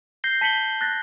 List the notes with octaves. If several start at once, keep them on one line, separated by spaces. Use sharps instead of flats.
G6 A#6 C7 G7
A5 B6 C#7 F#7 G7
F#6 A6 A#6